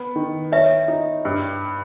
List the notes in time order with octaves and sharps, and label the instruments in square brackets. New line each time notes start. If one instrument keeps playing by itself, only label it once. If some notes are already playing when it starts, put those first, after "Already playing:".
Already playing: [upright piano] B3
D#3
[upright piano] C#5 [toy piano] E5
[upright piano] D#4
G2